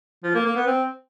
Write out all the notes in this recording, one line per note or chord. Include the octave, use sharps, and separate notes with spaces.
F3
A#3
A#3
B3
C4